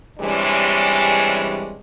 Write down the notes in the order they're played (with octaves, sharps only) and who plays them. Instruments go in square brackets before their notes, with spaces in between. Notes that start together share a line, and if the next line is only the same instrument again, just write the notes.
[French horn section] C3 E3 G3 G#3 C#4 D4